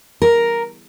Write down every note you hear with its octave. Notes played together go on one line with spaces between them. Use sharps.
A#4